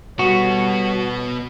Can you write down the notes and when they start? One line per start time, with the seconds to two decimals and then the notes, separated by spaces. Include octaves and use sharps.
0.19 B2 G3 B3 F#4 A4 C#5